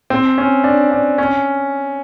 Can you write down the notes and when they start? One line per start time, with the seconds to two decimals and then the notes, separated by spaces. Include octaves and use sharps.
0.10 C4
0.38 C#4
0.64 D4
0.91 D4
1.18 C#4